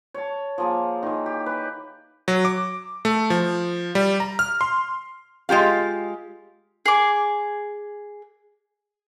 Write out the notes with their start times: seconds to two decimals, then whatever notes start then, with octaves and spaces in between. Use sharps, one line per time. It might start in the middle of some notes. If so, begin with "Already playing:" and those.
0.14 C#5 A5
0.58 F3 A#3 G#4
1.03 D#3 E3
1.26 G4
1.46 B4
2.28 F#3
2.45 D6
3.05 A3
3.30 F3
3.95 G3
4.20 A#5
4.39 F6
4.61 C6
5.49 G#3 F4 G4 F5
6.86 G#4 D6